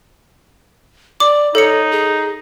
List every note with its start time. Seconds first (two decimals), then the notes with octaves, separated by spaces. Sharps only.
1.20 D5 D6
1.55 D#4 A4 C#5 C#7
1.91 G#4